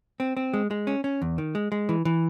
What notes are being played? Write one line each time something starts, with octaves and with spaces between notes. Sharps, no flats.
C4
C4
G#3
G#3
C#4
C#4
E2
D#3
G#3
G#3
E3
E3